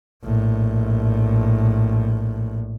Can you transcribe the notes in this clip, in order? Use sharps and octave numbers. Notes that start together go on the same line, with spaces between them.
A#1 A2